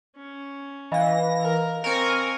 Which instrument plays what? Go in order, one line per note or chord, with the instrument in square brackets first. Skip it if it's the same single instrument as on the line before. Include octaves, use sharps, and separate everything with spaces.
[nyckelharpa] C#4
[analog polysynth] E3 A#6 [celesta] D#5 F5
[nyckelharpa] A#4
[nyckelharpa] C4 C#6 [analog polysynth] A#4 G#5